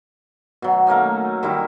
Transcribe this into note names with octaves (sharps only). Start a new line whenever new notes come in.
B2 F#3
A3 A#3 C#4 D#4
D#3 G3 E4